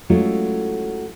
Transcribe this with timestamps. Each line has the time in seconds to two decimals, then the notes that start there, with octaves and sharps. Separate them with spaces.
0.10 F#3 G#3 A3 C#4 E4 F4